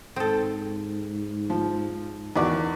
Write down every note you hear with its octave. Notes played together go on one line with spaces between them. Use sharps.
G#2 C4 A4
F3
E2 D#3 F#4 D5